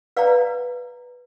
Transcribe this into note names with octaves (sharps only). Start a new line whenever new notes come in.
B4 D5 F5 A#5